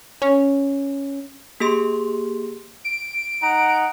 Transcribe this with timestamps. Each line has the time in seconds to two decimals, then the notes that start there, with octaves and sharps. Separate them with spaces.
0.22 C#4
1.60 A#3 G4 G#4 C6
2.84 D7
3.42 D#4 F#5 A#5